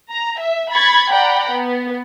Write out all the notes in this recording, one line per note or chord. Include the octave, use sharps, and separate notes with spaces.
A#5
E5
B5 C#6 G#6 A6
D5 F#5 G5 A#5 B5
B3